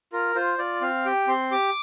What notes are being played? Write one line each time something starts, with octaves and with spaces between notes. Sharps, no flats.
F4 A#4
F4 C5
F4 D5
C4 F5
G4 G5
C4 C6
G4 D6